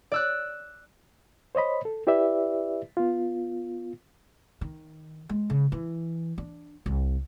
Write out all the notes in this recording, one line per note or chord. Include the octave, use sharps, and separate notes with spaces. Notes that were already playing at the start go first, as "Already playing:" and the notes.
D5 E6 F#6
C5 C#5 D#5 B5
A4
E4 G4 B4 D5 E5
B3 F4
D#3
G#3
C#3
E3
D4
C2